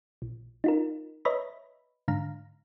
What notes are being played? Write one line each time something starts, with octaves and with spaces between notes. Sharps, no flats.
A#1
D#4 F4 A#4
B4 C#5 D#5 E5 A#5 B5
G#2 D3 F5 A#5